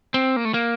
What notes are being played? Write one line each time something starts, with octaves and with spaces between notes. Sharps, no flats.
C4
A#3
A3
A#3